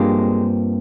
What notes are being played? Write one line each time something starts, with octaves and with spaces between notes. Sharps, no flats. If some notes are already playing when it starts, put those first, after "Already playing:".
Already playing: G2 F3 G#3 A#3 C4